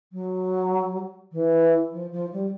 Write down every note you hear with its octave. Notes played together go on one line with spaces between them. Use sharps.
F#3
E3
F3
F3
G3